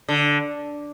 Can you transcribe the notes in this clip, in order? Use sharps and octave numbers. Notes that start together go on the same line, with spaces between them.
D3